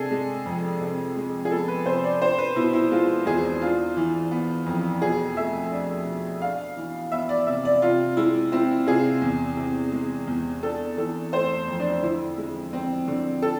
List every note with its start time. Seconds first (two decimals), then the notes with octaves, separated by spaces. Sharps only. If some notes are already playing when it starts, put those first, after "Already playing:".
Already playing: C3 D4 G#4 A4
0.11 G#3
0.46 F2
0.81 C3
1.16 G#3
1.45 G#4
1.51 B3 A4
1.68 B4
1.86 C3 C5
2.04 D5
2.21 D4 C5
2.38 B4
2.56 B2 E4
2.73 E4
2.91 G#3 F4
3.26 E2 G#4
3.61 D4 F4
3.97 E3
4.31 B3
4.66 F2
5.02 B2 G#4
5.37 A3 E5
5.71 D4
6.06 B2
6.42 D4 F5
6.77 E3
7.12 B3 E5
7.29 D5
7.47 C3 E5
7.65 D5
7.82 C3 F4
8.17 G#3 E4
8.52 C4 E4
8.87 C3 G#4
9.22 E2
9.57 C3
9.92 G#3
10.27 E2
10.63 D4 A4
10.97 E3 A4
11.33 A3 C5
11.68 F2
11.80 D4
12.03 D3 E4
12.37 G#3
12.73 C4
13.08 D3
13.42 A4